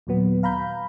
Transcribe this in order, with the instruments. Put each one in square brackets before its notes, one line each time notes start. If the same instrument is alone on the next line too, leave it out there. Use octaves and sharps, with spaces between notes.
[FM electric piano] D#2 A#2 F#3 B3
F5 A#5 B5 G6